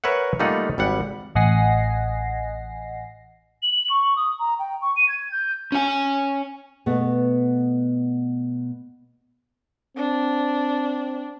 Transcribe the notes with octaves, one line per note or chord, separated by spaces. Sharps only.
A#4 B4 C#5 E5 F#5
G3 A3 A#3 D#4 F4 F#5
G#1 G3 F#5
A1 D#5 F#5 G#5 A#6 C7
F#7
C#6
D#6
A#5
G5
C#6
D#7
G#6
G6
C#4 G#5
B2 A3 B3
C4 D4